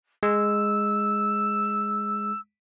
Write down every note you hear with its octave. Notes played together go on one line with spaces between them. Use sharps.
G#3 E6